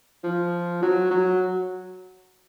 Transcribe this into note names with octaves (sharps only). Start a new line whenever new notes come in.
F3
F#3
F#3